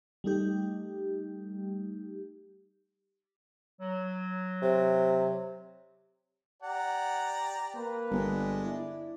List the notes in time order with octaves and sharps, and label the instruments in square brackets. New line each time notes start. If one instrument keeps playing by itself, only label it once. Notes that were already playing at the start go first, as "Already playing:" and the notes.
[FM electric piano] G3 A3 D#4 G4
[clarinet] F#3
[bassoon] C3
[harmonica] G4 D5 A#5 [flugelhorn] F#5
[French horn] A#3 [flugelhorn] B4
[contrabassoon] G1 [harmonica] G#3 D4
[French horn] E4 [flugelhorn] D5